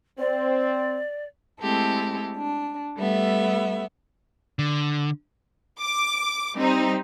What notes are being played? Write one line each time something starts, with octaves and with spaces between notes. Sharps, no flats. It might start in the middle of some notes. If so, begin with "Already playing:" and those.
C4 D5
G#3 A3 C4 E4 G4 A4
D4
G3 A3 B3 E5
D3
D6
G3 C4 D#4